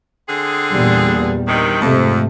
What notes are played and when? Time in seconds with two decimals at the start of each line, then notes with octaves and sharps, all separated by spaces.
0.29 D3 C4 G#4
0.71 E2 A#2 G3
1.47 G2 C3 D#3
1.81 F2 G#2 C3 A3